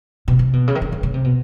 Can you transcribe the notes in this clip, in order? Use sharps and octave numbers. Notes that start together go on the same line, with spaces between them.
B2
C3
B2
C#3
D#3
D3
D3
C#3
C3
B2